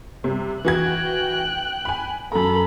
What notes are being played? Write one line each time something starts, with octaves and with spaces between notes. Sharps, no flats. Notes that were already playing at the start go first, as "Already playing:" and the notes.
C3 G3
E3 F#4 G5 F#6 G#6
G#5 B5
F#2 A4 A#5 B5